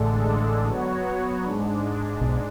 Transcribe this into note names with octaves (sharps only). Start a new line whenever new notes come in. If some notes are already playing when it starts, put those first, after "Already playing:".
Already playing: A1 A2 D3 G#3 D4 A4
F#3 B3 F#4 C#5
G#2 G#3 D4
B1 B2